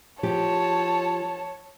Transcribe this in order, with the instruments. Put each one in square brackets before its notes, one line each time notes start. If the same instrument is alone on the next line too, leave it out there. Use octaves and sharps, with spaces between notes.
[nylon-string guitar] F3 G4 [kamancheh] C#5 A5